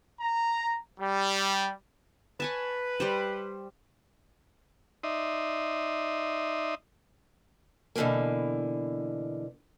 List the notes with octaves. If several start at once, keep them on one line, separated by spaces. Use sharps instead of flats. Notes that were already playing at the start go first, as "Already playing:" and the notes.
A#5
G3
B4 C#5 G#5 A5
G3 G4 C5
D#4 D5 E5 C6 D#6
B2 D3 E3 A3 A#3